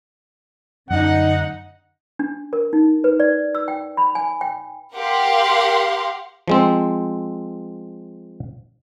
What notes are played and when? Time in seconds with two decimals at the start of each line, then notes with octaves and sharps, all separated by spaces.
0.91 F#2 D3 D#4 F#5
2.19 D4
2.53 A#4
2.73 D#4
3.04 B4
3.20 D5
3.55 E6
3.68 G5
3.97 B5
4.15 G#5
4.41 G5
4.95 G4 A#4 F5 F#5 C6
6.48 F3 G#3 C4